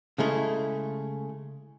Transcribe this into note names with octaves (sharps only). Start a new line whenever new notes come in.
C#3 G#3 A3 E4